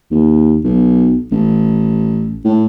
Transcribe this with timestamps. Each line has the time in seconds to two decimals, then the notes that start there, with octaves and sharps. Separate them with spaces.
0.11 D#2
0.64 B1
1.31 A1
2.44 A2